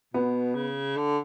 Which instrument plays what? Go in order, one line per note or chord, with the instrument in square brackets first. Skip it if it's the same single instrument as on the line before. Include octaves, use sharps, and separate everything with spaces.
[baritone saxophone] B2 [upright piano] B3
[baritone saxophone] C#3
D3